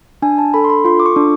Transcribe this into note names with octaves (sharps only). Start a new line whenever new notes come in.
D4 G#5
A5
A4 B5
C6
B5
F4 C6
D6
C#6
D4